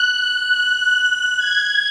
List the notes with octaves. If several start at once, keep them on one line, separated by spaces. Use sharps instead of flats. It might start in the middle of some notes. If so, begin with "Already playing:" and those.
Already playing: F#6
F#6
G#6